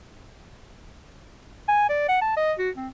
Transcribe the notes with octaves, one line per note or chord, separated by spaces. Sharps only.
G#5
D5
F#5
A5
D#5
F#4
C4